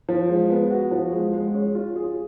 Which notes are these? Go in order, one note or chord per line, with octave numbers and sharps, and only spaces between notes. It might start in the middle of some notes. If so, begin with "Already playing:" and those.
F3
G#3
B3
F#4
F3
G#3
G#3
C#4
F4
G#4